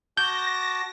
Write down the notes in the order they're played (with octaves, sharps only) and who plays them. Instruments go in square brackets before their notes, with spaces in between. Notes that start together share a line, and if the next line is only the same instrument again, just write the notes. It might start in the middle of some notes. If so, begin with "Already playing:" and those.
[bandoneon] F#4 A5 D6 [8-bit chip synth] G6 [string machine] A#6